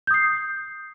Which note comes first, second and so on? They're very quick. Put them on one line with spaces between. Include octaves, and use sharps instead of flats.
G6 D#6 C7